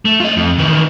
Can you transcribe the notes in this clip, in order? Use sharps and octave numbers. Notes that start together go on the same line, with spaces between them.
A3
F4 D#5
F2
D#3 E3